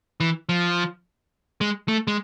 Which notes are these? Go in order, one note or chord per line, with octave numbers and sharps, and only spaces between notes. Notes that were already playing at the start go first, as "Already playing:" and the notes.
E3
F3
G#3
A3
G#3